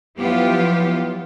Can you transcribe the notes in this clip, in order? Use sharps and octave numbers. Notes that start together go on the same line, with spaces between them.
F3 F#3 B3 E4 F4 G4